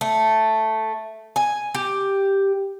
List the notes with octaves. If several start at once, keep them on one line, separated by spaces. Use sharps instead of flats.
A3
G#5
G4